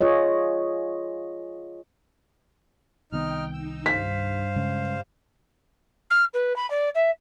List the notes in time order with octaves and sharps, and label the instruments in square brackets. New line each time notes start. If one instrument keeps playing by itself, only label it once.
[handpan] F4 G#4 C#5 D#5
[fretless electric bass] C2 D#3 B3 [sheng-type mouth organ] D#4 F6 [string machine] G5
[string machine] D#4 [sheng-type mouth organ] E6
[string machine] G2 [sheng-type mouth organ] C5 F5 [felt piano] B6
[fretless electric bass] C#3 G#3
[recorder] F6
B4
B5
D5
E5